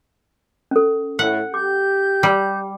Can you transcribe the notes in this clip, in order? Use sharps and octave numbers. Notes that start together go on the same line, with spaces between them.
C#4 A4
A2 F#5
G4 D6 G6
G3